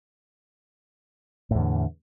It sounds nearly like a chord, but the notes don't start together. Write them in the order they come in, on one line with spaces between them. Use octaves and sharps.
A2 E2 D3